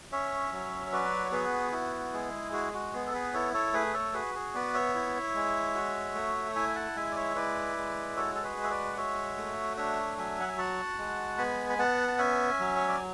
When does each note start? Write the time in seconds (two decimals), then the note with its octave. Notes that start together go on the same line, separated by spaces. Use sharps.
0.12 C#4 C#5 E5
0.52 F#3
0.87 C#5
0.93 F#4 B4 D5
1.25 C#5
1.32 B3 G#4 B4
1.72 E4 F#4
2.13 G#3 G#4
2.53 F#4 G#4
2.74 F#4
2.93 B3 G#4
3.07 A4
3.14 G#4 B4
3.33 E4 A4 C#5
3.54 A4 C#5
3.73 A3 G#4 B4
3.93 A4 C#5
4.13 F#4 G#4 B4
4.35 G#4
4.55 B3 B4 D5
4.74 C#5 E5
4.95 E4
5.35 G#3
5.75 F#4
6.15 A3
6.55 E4 E5 G#5
6.75 F#5 A5
6.96 G#3 E5 G#5
7.11 D5
7.16 C#5 E5
7.35 E4 B4 D5
7.77 G#3
8.16 F#4 A4 C#5
8.35 A4
8.43 G#4 B4
8.57 G#3
8.64 E5
8.70 B4 D5
8.93 F#5
8.97 F#4 C#5 E5
9.37 A3
9.77 D4 C#5 E5
10.18 F#3 E5 G#5
10.40 F#5
10.48 G#5
10.58 F#4 F#5 A5
10.98 G#3
11.38 B3 G#5 B5
11.69 B5
11.78 B3 F#5 A5
12.08 A5
12.18 C#4 E5 G#5
12.60 F#3
12.76 C#5
12.88 D5